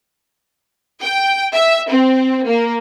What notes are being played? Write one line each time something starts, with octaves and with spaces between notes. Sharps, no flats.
G5
E5
C4
A#3